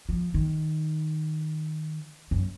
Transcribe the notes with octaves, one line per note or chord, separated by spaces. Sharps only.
F3
D#3
F#2